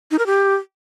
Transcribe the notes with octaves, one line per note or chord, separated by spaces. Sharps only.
D#4
A#4
G4